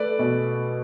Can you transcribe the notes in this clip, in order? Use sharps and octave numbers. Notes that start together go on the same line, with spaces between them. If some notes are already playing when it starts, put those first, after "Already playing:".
Already playing: A3 B4 D5
B2